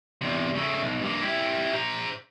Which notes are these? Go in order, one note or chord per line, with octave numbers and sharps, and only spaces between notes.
E2 C3
C#3 A3
B1
G2 A#3
E4 G4
C5 A#5